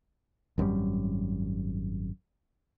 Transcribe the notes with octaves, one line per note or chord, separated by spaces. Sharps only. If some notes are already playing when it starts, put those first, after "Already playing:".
G#1 F#2 B2 G3